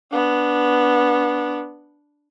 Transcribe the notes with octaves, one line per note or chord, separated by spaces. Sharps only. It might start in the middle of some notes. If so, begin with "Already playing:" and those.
B3 D4